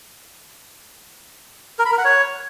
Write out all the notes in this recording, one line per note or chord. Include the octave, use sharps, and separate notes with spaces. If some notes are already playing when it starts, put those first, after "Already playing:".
A#4
B5
A#4
F#5
C#5